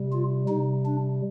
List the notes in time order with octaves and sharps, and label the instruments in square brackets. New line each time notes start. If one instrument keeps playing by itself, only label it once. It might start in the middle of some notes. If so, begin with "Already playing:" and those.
Already playing: [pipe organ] C3 G3
F4
C3 G3 D#4
D4